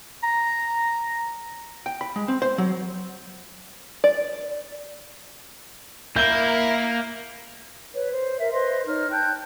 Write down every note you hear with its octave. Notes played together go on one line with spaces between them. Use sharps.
A#5
G5
B5
G#3
C4
C5
F#3
D5
A#3 E4 A#4 G6 G7
B4 C#5
C5
A#4 E5
B4 C5 D#5 C6
D#4 C#5 D#5 F6
G5 A5 F#6 G6